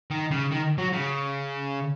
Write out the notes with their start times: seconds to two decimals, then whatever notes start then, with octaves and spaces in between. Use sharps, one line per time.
0.11 D#3
0.31 C#3
0.51 D#3
0.78 F#3
0.93 C#3